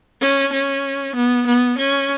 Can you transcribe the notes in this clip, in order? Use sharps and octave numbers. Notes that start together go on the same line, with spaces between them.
C#4
C#4
B3
B3
C#4